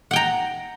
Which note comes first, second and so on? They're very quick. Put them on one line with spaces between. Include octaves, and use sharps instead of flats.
F#5 G5 A#5